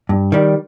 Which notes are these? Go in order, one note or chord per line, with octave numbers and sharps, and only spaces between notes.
G2
D#3 G3